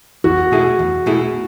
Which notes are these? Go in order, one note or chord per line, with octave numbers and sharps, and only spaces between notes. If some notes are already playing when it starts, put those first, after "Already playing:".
E2 F#4
B2 A3 E4 G#4
E2
B2 A3 E4 G#4